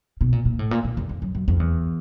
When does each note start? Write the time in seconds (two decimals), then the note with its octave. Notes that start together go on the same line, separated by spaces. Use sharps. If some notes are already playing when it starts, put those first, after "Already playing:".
0.21 B2
0.32 A#2
0.45 A#2
0.59 A2
0.71 A#2
0.84 A#2
0.97 E2
1.09 F2
1.22 F#2
1.35 F#2
1.48 F2
1.60 E2